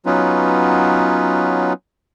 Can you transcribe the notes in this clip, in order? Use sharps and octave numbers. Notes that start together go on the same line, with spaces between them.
F#3 B3 C#4 D#4 F4 B4